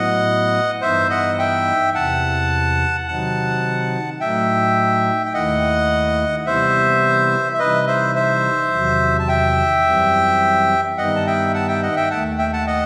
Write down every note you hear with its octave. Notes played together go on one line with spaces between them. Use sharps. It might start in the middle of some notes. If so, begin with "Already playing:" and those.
Already playing: A2 F#3 B3 E4 D#5 F#5
G2 E3 B3 D#4 C5 E5
D#5 F#5
E5 G5
E2 C3 E3 F#5 A5
C3 D#3 F#3 C4 D#4 F#5 A5
A2 F#3 A3 D#4 E5 G5
G5
D#2 D#3 A3 E4 D#5 F#5
C3 E3 G3 B3 E4 C5 E5
E5
C3 E3 G3 D#4 B4 D#5
C5 E5
C5 E5
E2 C3 D#3 F#3
A5
E5 G5
F#2 E3 G3 C4
G2 D#3 G3 B3 D#4 D#5 F#5
A5
E5 G5
F#5 A5
E5 G5
D#5 F#5
E5 G5
D#2 D#3 A3 F#5 A5
E5 G5
F#5 A5
D#5 F#5